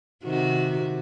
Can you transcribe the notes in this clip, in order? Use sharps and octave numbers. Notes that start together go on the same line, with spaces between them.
C3 D#3 F#4